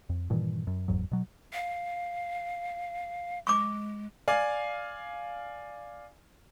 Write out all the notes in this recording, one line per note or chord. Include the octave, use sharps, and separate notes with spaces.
F2
G2 A#2 D#3 E3
F#2
F#1 E2 G#2 F#3
B2 F#3
F5
G#3 C#6 D6
D5 F5 G#5